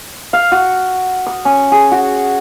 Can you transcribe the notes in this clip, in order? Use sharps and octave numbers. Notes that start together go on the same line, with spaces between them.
F5
F#4
D#6
C#4
G#4
F#4